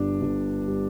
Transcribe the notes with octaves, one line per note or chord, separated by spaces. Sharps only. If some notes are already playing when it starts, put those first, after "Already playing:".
Already playing: G1 G2 G3 D4
G1
G3